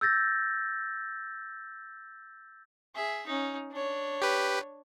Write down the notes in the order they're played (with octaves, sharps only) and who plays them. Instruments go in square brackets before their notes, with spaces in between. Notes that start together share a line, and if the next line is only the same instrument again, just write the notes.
[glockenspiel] E6 G6 A6 A#6
[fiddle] G#4 E5
C#4 D#4
D4 C#5
[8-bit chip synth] G4 B4